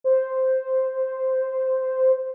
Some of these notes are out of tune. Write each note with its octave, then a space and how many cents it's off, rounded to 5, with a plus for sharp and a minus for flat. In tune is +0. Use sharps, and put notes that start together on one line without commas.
C5 -5